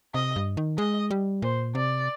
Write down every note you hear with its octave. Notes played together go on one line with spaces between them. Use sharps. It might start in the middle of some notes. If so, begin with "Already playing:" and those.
C3 D#5
G2
D#3
G#3 D#5
G3
A#2 C5
C3 D5